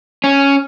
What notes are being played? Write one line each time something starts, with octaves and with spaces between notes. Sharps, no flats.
C#4